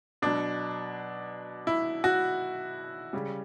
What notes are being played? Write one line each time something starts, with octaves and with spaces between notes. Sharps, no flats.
B2 F#3 D4
E4
F#4
C#3 G3